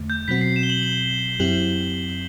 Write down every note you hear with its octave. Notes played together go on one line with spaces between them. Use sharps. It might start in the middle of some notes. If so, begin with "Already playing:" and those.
Already playing: E2 D3 A3
G6
B2 F#3 C4 F#4 B6
C7
E7
G7
F#7
G7
F#2 F#3 C4 E4 G4 F#7